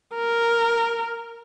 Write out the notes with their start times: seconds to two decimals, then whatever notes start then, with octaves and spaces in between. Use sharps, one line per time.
0.14 A#4